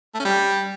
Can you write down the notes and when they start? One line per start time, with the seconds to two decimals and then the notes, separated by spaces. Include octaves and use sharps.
0.14 A3
0.20 C#4
0.25 G3